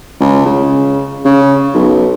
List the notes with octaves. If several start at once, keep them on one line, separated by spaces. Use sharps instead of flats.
C#2
C#3
C#3
B1